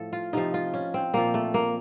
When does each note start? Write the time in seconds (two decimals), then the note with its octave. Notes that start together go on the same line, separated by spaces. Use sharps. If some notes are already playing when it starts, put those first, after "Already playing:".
Already playing: A2 F3 A4
0.13 F4
0.33 C3 F3 D#4
0.54 F4
0.74 C#4
0.94 C4
1.13 A#2 F3 A#3
1.34 A3
1.54 A#3